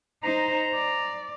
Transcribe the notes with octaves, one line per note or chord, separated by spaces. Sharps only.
D#4 C5 A#5
D5